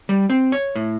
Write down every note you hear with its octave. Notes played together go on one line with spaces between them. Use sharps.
G3
C4
C#5
A2